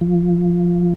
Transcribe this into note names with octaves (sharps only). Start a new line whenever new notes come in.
F3